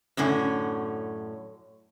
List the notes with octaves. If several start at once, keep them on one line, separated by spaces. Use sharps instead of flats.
F#2 A2 D3 C#4